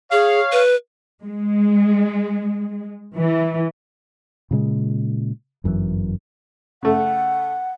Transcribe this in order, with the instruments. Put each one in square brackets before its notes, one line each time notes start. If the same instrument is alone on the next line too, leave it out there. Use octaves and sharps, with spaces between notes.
[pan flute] G#4 [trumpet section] C#5 F5
[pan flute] B4
[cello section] G#3
E3
[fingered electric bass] A#2 C#3 G#3
G1 F#2 C3 E3
[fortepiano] C#3 A3 [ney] F#5